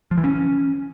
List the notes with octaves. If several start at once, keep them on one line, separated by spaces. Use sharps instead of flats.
F3
E3
C#4